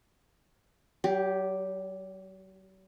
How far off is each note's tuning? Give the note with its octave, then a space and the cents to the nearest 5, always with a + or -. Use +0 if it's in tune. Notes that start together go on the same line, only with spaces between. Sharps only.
F#3 +45 G4 +0